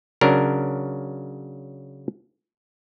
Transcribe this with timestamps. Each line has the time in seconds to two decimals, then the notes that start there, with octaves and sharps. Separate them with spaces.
0.21 C#3 F#3 D4 A#4